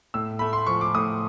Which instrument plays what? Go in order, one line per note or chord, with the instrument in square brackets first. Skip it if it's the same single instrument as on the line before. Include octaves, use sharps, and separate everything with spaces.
[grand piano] A2 E6
A3 B5
C6
F3 C#6
D6
A2 D#6